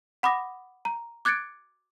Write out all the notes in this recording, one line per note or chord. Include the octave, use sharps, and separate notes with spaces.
F#5 B5 D6 D#6 A#6
A#5
D6 F#6 G#6 A6 C#7 D7